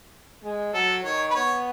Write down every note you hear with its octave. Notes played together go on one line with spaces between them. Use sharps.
G#3
F#3 A4
D#3 C#5
B4
B3 C#5